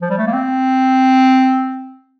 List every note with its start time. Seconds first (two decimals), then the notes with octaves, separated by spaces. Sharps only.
0.02 F3
0.10 G3
0.18 A3
0.27 A#3
0.33 C4